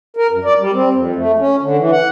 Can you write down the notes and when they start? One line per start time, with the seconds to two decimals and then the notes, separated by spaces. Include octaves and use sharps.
0.17 A#4
0.31 F#2
0.45 D5
0.59 G3
0.74 C4
0.94 F2
1.16 A3
1.39 C#4
1.62 D3
1.78 E3
1.92 F#5